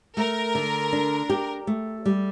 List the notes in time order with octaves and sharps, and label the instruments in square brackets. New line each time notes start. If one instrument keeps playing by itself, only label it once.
[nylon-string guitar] A3 [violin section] A#4
[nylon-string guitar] D3
D4
G4
A3
G3